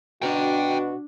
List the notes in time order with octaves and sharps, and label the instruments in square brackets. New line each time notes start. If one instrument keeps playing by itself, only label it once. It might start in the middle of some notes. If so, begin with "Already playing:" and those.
[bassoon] B2 [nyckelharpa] D4 [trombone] F#4 [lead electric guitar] G5 A#5